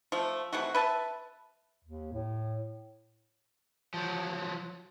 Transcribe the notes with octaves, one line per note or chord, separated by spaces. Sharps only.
F3 A3
C3 E3 A3 F#4
B4 E5 A5
D#2
A2
F3 F#3